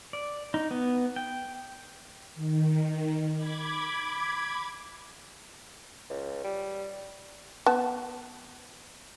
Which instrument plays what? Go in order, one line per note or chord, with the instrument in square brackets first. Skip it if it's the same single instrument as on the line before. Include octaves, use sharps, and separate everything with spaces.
[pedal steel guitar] D5
D#4
B3
G5
[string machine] D#3
B5 D6 G#6
[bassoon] C#2
G3
[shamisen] B3 A5